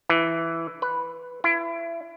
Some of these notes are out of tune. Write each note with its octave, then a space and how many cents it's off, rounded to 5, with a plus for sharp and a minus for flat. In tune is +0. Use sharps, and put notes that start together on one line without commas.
E3 +5
B4 +0
E4 +30